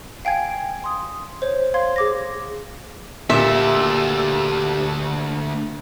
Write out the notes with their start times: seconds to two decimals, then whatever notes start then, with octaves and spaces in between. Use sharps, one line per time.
0.25 F5 G5 G#5 G#6
0.84 C6 D#6
1.42 C5 C#5
1.74 F5 C6 G#6
1.96 G#4 D6 A#6
3.30 D2 A#2 G4 A4 E5